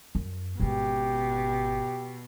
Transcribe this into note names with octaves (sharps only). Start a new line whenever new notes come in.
F#2
G#1 B2 C#4 G4